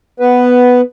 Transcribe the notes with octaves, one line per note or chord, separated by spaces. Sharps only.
B3 B4